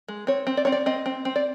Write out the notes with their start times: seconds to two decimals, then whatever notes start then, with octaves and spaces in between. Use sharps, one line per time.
0.08 G#3
0.27 C4 C#5
0.47 C4
0.57 D5
0.65 C4 C#5
0.72 D5
0.86 C4 D#5
1.06 C4
1.25 C4
1.36 D5